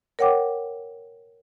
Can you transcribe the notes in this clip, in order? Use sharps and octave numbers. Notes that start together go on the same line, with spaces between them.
A#4 C#5 F#5 G5 D6